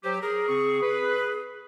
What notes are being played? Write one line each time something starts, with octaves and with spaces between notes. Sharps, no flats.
F#3 G4 C5
G#4 A#4
C#3 C4 C#6
B4